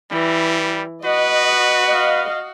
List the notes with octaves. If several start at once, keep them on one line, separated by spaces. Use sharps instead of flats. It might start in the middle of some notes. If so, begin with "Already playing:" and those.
E3 G3
F#4 B4 D#5
D#5 F5